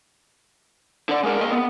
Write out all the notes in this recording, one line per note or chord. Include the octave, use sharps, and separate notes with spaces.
D3 D5
G#3 A#4
D#2 D#5
B3